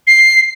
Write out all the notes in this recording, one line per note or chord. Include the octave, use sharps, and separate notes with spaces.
C7